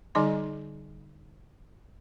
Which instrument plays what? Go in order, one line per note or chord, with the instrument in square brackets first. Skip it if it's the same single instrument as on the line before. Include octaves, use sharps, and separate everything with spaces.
[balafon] D3 G3 D#4 D#5 C6